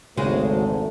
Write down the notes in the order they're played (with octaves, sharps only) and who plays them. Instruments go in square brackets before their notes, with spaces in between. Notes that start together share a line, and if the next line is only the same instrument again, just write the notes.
[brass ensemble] G#1 D2 A3 [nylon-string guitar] C#3 G#3 F#4